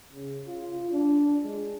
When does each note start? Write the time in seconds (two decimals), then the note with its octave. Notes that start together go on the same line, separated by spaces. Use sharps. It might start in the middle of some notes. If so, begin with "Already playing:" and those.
0.13 C#3
0.46 F4
0.91 D4
1.43 G#3